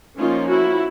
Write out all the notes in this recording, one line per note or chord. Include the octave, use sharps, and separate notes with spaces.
F3 A#3 C#4 D#4 F4
E4 F#4